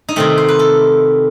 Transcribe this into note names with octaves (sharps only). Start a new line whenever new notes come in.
D#4
C3 D#3 A3 C4
C5
B4
A4